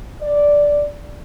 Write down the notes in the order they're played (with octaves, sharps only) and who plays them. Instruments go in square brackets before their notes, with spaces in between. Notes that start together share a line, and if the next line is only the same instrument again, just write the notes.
[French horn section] D5